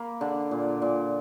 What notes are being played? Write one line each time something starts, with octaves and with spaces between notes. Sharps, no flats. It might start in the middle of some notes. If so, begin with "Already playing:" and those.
Already playing: A#3 B5
D3
A#2
A#2